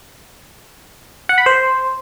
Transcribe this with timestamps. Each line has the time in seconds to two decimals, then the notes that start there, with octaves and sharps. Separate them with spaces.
1.29 F#5
1.38 B5
1.46 C5